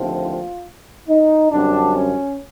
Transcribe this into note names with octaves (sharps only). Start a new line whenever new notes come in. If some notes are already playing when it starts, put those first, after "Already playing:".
Already playing: D#2 D3 F3 A3 C4
F4
D#4
F#2 D3 G3 C4 D4
C#4